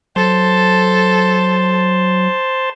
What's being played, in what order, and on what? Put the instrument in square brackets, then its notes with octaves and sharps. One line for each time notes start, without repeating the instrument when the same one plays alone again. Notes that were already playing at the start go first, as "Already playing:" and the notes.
[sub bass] F#3 [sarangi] A4 [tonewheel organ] C5 A5 C6